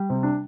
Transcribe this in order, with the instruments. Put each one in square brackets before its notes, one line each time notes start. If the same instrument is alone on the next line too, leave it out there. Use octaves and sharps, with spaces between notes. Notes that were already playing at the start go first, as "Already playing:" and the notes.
Already playing: [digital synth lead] G3
[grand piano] C3 C4
D4